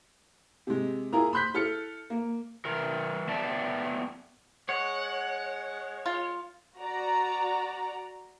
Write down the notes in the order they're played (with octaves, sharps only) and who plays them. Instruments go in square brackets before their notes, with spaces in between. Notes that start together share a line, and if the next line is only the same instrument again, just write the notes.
[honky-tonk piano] C3 G#3
E4 F4 G#4 A#4 A#5
B5 C6 F#6 G6 B6
E4 A4 F6 C#7
A#3
[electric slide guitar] E3 A#4
B3 B4 D5 E5 G5 A5
[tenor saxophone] G#3 [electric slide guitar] C#5 [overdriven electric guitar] F#5
[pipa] F4
[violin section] F#4 D5 A#5